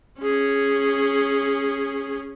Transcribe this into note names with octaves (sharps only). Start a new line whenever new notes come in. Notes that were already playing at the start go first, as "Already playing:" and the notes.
C#4 G#4